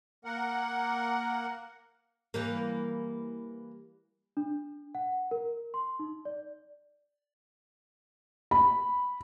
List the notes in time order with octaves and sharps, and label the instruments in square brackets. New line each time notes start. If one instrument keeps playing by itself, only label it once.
[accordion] A#3 A#4 F#5
[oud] E3 G3 A#3
[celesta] D4
F#5
A#4
C6
D#4
D5
[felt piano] B5